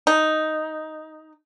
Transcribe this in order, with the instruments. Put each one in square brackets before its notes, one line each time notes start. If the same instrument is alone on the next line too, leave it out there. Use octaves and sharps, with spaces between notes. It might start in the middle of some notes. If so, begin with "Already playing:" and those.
[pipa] D#4